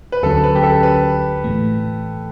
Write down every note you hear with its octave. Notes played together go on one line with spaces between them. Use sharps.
B4
D2 D3 F#3 C#4 A4
B4
G4
A4
B4
A2 E3 A3